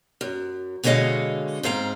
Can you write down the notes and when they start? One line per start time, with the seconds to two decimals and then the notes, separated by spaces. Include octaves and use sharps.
0.21 F#2
0.83 B2 D3 G#3 C#5 D#5 F5
1.63 G#2 C4 F5 A#5